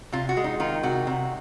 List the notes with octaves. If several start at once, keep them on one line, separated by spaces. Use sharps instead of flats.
C3 F4
F#4
G#3
D#4
D#3 F4
C3 F#4
C3